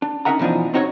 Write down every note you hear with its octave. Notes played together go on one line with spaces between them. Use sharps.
D4
C#4 D#4 A#4 E5 F#5 A#5
B2 E3 F3 D4 D#4
C4 D#4 F#4 A#4 C#5